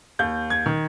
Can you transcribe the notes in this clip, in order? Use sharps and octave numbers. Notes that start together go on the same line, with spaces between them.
D#2 G6
G#6
D#3